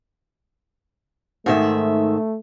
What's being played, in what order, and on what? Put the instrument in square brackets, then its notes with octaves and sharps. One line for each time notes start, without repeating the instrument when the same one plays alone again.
[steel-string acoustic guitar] G#2 D#3 E5 [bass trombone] A3